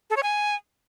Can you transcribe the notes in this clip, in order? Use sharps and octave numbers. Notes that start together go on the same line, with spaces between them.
A4
C#5
G#5